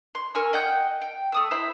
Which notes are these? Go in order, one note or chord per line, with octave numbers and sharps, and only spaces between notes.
C6
A#4 G#5 C#6 E6
D#5 F#5 G5 G6
G5
A3 D#6 E6
E4 C5 E5 B5